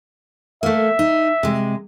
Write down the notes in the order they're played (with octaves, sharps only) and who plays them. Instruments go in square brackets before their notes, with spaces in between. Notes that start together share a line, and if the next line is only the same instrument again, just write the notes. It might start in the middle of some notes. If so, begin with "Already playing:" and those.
[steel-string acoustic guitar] A3 A#3 [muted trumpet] E5
[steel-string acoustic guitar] D#4
C3 G#3